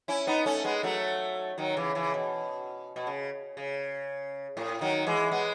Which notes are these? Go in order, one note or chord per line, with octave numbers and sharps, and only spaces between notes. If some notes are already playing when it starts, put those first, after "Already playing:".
C#4 E4
B3 D#4
A3 C#4
G#3 B3
F#3 A3
D#3 F#3
C#3 E3
C#3 E3
B2
B2
C#3
C#3
A2
D#3 F#3
E3 G#3
G#3 B3